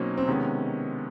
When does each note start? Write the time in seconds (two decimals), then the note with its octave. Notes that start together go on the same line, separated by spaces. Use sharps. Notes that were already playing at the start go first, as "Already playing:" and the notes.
Already playing: B2 F#3 A#3 C4 C#4 D#4
0.18 C4
0.28 C3 D#3 G#3 B3 C#4